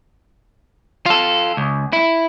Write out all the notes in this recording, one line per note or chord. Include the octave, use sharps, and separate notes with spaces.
F4 A4
C#2
E4